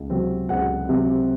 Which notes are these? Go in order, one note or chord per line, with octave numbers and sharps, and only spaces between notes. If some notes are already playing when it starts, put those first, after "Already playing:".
Already playing: C#2
C3 F#3 C4
C#2 F#5
C3 F#3 C4